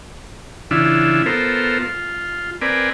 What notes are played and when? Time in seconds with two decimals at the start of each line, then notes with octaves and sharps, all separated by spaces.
0.71 C#3 E3 D4 E4 F4
1.26 B3 F4 A4 A#4 C5
1.82 F4
2.62 C4 A#4 B4 D5 G#5